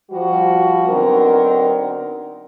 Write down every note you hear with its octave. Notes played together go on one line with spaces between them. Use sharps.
F3 G3 F#4
D3 F#3 B3 C4 D#4 A#4